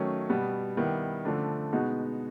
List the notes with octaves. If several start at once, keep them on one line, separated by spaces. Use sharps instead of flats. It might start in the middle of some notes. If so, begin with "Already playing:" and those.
Already playing: D#3 F#3 A3 C#4
B2 G3 B3
D#3 G3 B3 E4 G4
D3 F3 A3 D4
B2 G#3 B3 D#4 F#4